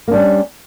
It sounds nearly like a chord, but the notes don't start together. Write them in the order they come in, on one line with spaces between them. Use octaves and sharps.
A#3 D4 G3 C#4